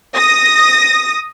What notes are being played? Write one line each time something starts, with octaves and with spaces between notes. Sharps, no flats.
D#6 A#6